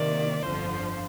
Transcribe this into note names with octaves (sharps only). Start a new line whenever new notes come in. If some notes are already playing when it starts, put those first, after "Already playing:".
Already playing: C3 D#3 A#3 D5
G1 F2 D3 F3 C5